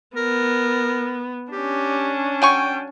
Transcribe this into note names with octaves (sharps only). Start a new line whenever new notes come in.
B3 A#4
C#4 D4 G4
F#3 G5 G#5 C#6